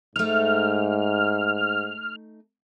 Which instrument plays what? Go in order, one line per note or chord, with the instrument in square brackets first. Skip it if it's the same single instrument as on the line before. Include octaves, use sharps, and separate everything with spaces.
[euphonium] G#2 [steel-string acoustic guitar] A3 D#4 [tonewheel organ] F6